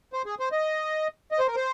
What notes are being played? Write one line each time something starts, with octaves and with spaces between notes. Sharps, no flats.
C5
G#4
C5
D#5
D#5
C5
A#4
C5